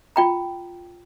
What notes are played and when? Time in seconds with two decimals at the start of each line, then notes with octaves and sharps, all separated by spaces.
0.16 F4 G5 A#5